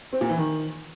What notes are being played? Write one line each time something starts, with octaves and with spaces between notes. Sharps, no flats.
C4
A#2
E3
D#3